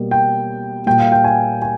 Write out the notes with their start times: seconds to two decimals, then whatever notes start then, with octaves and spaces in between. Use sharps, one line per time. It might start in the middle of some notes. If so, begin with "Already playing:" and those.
Already playing: B2 G3 A#3
0.11 G5
0.86 A#2 G3 A#3 G5
0.99 F5
1.12 G5
1.24 G#5
1.62 G#5